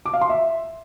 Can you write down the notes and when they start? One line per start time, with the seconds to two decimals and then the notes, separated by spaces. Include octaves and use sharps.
0.06 D6
0.14 F5
0.21 C6
0.29 E5